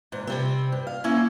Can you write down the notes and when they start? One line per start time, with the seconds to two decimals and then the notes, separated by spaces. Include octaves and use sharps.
0.12 E2 G#2
0.27 C3 G3 C4
0.72 G2
0.87 F5
1.04 A#3 C#4 E4